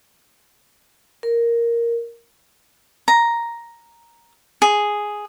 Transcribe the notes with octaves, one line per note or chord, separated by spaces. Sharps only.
A#4
A#5
G#4